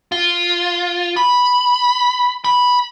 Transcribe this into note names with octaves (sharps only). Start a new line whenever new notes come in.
F4
B5
B5